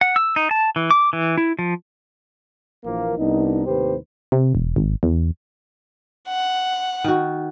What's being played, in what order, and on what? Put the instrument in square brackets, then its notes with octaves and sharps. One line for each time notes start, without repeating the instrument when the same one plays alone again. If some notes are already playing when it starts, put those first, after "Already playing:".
[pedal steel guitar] F#5
E6
D#4
A5
E3
D6
E3
E4
F3
[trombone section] A#1 E3 F3 A#3
C2 B3 D4 D#4
D#2 A2 C3 G4 B4 C5
[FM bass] C3
E1
G#1
E2
[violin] F#5
[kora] D#3 F#4